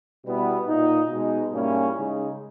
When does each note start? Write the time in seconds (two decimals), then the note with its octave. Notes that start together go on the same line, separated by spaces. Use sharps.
0.24 B2 G3 B3 E4
0.67 A#2 A#3 D#4
1.09 B2 G#3 D#4
1.52 G#2 G3 A#3 C#4 E4
1.94 C#3 G#3 D#4